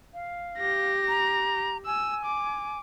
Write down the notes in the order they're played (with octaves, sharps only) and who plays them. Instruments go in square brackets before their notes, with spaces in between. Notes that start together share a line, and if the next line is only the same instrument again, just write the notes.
[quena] F5
[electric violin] G4 A#6
[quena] A#5
[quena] G#5 [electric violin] E6
[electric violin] D6